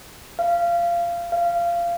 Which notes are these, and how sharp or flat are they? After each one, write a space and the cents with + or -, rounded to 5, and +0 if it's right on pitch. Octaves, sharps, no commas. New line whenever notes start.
F5 -20
F5 -20